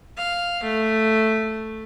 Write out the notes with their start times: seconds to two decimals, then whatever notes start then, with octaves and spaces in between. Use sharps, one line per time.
0.17 F5
0.63 A3